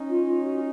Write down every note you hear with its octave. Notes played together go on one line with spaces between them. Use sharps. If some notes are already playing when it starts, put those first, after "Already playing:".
Already playing: C#4 D#4
F4
F4
F#4